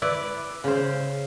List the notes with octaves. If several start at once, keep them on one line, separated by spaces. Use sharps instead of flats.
E4 B4 D5
C#3 C5